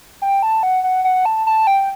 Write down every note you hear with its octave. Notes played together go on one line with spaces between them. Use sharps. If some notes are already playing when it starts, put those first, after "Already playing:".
G5
A5
F#5
F#5
F#5
A5
A5
G5